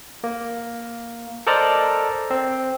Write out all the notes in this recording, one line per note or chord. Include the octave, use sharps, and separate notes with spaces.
A#3
A4 A#4 C5 D5 D#5 A#5
C4